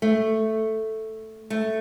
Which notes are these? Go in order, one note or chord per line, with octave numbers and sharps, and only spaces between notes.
A3
A3